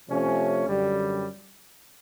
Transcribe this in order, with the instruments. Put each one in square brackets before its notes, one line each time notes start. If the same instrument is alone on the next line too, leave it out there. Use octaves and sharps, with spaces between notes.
[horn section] C3 F3 A3 C#4
F#2 D3 G3